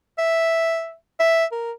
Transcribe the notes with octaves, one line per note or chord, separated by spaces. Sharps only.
E5
E5
A#4